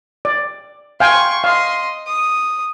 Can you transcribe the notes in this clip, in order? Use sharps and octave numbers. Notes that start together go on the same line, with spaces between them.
D5
F5 G5 G#5 C6 C#6
D#5 F5 C6
D#6